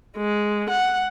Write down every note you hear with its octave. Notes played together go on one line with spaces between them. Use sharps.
G#3
F#5